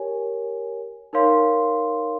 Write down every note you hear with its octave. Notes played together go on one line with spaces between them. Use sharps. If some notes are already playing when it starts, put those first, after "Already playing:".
Already playing: G4 A#4 C#5 G#5
D#4 A#4 C#5 F5 C6